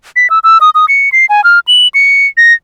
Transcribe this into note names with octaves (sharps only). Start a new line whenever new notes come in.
B6
E6
E6
D#6
D#6
C#7
C7
G#5
F6
F#7
C#7
A#6